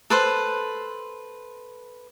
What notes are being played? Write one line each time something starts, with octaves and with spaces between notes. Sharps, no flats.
A4 B4 C5